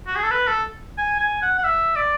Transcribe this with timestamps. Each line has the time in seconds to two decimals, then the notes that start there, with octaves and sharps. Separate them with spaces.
0.07 F#4
0.16 G#4
0.23 A4
0.31 B4
0.48 A4
0.98 G#5
1.20 G#5
1.42 F#5
1.58 F#5
1.64 E5
1.96 D5